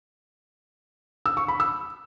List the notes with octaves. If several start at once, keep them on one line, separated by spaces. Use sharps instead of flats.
E6
C#6
B5
E6